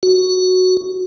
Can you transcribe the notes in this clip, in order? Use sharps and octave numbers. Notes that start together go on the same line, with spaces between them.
F#4